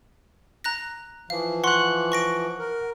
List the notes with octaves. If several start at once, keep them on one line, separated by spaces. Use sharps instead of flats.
A#5 F#6 A#6
E3 F3 F5
F#5 C6 C#6 F#6
C#6 A#6 D7
A#4